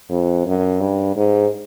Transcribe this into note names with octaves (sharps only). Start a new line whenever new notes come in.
F2
F#2
G2
G#2